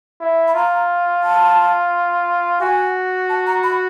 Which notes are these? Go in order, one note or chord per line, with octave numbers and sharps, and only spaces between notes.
E4
B5
F4 A#5
A5
F#4 G#5
A5
A#5
B5